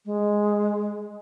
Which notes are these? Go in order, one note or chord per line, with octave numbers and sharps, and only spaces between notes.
G#3